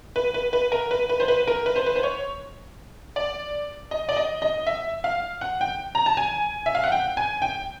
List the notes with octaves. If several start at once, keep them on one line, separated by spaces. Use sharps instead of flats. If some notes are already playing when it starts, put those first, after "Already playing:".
B4
B4
B4
A#4
B4
B4
C5
B4
A#4
B4
C5
B4
C5
C#5
D5
D#5
D5
D#5
D#5
E5
F5
F#5
G5
A#5
A5
G#5
E5
F5
F#5
G5
G#5
G5